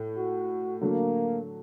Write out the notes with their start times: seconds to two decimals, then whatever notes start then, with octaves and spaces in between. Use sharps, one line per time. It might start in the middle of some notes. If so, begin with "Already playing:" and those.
Already playing: A2 A3
0.18 F#4
0.81 D3 F#3 A3 A#3